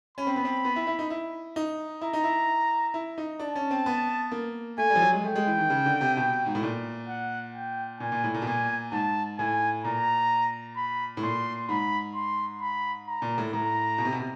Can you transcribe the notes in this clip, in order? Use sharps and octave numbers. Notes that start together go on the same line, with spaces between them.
C#4 B5
C4
B3
C4
B3
E4
E4
D#4
E4
D#4
E4 A#5
D#4
E4
E4
D#4
D4 A5
C#4
C4
B3
A#3
A3 G#5
G3
F3
F#3
G#3
A3 G5
G#3
E3
D#3
C#3
D3
C3
B2
G#2
A2
A#2
F#5
G5
A#2 G#5
A#2
A2
A#2
B2
A#2 G#5
G#2 A5
A2 G#5
A#2 A#5
B5
A2
A#2 C6
G#2 B5
C6
B5
A#5
A#2
A2
A2 A#5
B2
C3
B2
C3